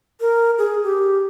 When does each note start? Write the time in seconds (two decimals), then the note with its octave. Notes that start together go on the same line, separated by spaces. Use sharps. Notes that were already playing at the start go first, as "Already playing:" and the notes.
0.20 A#4
0.58 G#4
0.83 G4